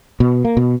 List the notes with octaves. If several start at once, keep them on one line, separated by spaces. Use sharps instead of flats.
B2
A#3
B2